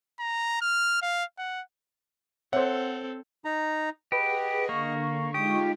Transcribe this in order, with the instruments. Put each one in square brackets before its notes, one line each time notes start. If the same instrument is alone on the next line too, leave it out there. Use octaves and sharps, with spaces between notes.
[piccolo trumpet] A#5
F6
F5
F#5
[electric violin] C4 A4 [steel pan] C5 E5 [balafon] C#5 [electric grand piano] F#5
[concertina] D#4 A#5
[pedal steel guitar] G4 [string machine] G#4 F#5 [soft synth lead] B4 [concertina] D#5
[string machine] D3 [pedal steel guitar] A#3 [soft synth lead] C#6
[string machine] G#3 D#4 F4 [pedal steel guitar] G4 [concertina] D#6